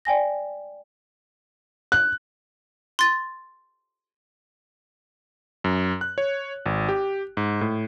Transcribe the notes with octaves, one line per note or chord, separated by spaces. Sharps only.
D5 G5 G#5 A#6
F#6
C6 A6
F#2
F#6
C#5
G#1
G4
G#2
A2